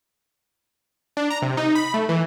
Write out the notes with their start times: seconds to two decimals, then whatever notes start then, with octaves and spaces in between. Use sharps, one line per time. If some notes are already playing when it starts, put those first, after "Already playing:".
1.17 D4
1.30 A#5
1.42 C3
1.57 D#4
1.75 B5
1.94 A3
2.09 E3